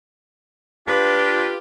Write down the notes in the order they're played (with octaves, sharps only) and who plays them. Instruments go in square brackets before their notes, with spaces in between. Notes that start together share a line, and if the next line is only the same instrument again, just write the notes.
[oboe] D4 [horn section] F4 G4 [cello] B4